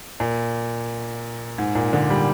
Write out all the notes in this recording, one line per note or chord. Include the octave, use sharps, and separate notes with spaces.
A#2
G#2
A#2
D3
G3